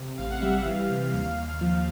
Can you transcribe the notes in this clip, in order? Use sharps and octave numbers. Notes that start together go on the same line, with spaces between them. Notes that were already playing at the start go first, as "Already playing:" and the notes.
Already playing: C3
A1 F5
F#5
G3 E5
F#5
E3 F5
C3
D#2 F5
D#2
F3 F5